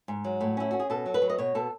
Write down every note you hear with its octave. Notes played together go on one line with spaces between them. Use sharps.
G#2
F#3
A2
C#4 E4
C#4 F#4
G#4
B2 A4
F#3
B4
F#3
D#5
B2 C#5
B2 A4